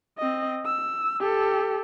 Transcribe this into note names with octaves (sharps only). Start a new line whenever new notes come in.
C4 D#5
E6
G4 A4